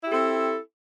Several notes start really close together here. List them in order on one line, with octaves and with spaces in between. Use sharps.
E4 G4 A4 C4